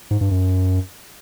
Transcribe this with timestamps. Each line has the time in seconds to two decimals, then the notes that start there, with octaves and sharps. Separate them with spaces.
0.11 G#2
0.21 G2
0.31 F#2